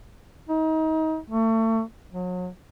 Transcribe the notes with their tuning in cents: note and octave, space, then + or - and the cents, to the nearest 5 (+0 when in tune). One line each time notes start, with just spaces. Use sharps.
D#4 +30
A3 +35
F#3 -35